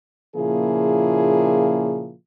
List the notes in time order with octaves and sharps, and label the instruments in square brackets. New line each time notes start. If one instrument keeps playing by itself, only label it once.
[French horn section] A#2 C#3 F3 A#3 E4 G#4